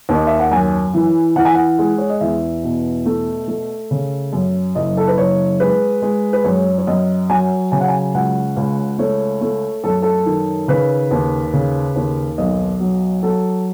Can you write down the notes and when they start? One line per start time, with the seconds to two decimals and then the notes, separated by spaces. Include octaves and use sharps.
0.09 D#2
0.14 D#5
0.27 E5
0.40 F#5
0.51 F#2 G#5
0.94 E3
1.36 E3 F#5
1.45 G#5
1.55 F#5
1.79 G#3
1.98 C#5
2.10 D#5
2.21 E2 E5
2.63 B2
3.06 A3
3.48 A3
3.91 C#3
4.33 F#2
4.75 F#1 D#5
4.97 A4
5.08 B4
5.18 F#1 C#5
5.60 G#3 B4
6.02 G#3
6.33 B4
6.44 F#2 C#5
6.78 C#5
6.87 F#2 D#5
7.30 F#3 G#5
7.72 C#3 G#5
7.81 F#5
7.88 G#5
8.14 C#2 F#5
8.57 C#2
8.99 A3 C#5
9.42 A3
9.84 F#2 A4
10.02 A4
10.26 D#3
10.68 C#3 B4
11.11 D#2
11.53 C#3
11.96 D#2
12.38 B1 D#5
12.80 F#3
13.23 F#3 A4